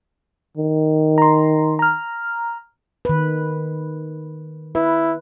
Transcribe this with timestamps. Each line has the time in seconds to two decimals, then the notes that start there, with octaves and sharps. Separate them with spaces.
0.57 D#3
1.18 A#5 C6
1.79 A#5 F6
3.05 D#3 B4
4.75 E4 B4